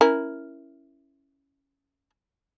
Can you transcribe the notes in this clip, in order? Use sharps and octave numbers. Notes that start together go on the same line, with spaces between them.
C#4 E4 A#4